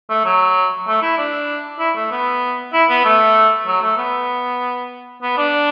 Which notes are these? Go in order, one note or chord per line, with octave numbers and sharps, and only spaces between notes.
A3
F#3
A3
E4
D4
E4
A3
B3
E4
B3
A3
F#3
A3
B3
B3
D4